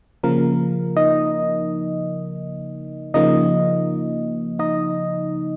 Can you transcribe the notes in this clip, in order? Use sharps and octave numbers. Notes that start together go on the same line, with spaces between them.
C#3 F3 A#3 A#4
D#4 D#5
C#3 F3 A#3 D#4 D#5
D#4 D#5